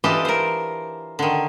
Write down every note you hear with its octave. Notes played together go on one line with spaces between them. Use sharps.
E3 D4 F4 G4 A4 D#5
A#4 C5
D3 D#3